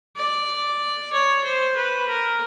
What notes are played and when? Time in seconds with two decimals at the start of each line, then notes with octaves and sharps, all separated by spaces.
0.16 D5
1.12 C#5
1.44 C5
1.76 B4
2.08 A#4